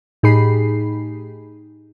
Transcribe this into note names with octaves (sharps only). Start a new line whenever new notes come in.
A2 D#4 G4 G#4 B5 C7